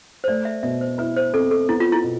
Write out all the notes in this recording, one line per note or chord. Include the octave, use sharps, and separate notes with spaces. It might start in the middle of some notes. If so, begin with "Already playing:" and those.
C5
A3 D5
E5
B2 E5
C5
E4 B4
C5
C4 A4
A4
B3 E4
F4
E4
B2